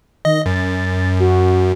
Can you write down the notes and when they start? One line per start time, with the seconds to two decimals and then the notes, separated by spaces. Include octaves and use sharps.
0.25 D#3 D#5
0.46 F#2 A6
1.20 F#4